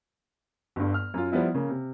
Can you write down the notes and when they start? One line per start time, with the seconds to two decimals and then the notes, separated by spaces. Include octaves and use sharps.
0.76 G1 G2
0.94 F6
1.14 F#2 F4
1.32 F3 G3 B3 E4
1.54 C#3 A#3
1.69 C3